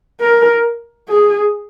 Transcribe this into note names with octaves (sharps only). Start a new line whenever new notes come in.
A#4
G#4